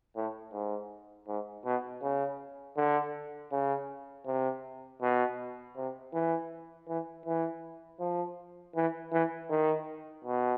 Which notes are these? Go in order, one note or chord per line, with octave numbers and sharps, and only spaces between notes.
A2
G#2
G#2
B2
C#3
D3
C#3
C3
B2
C3
E3
E3
E3
F3
E3
E3
D#3
B2